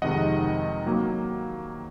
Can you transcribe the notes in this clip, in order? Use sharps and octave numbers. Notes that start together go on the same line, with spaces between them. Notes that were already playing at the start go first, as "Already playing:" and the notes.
F2 C3 D#3 G#3 D#5 F#5
F#3 A#3